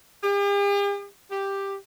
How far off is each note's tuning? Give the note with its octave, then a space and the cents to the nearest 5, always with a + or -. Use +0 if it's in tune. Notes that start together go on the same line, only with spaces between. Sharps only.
G4 +45
G4 +5